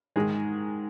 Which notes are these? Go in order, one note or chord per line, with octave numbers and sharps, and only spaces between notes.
G#2 D#3 G#3 G#4